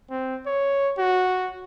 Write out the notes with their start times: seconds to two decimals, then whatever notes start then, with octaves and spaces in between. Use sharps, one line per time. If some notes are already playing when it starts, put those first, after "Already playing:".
0.10 C4
0.46 C#5
0.98 F#4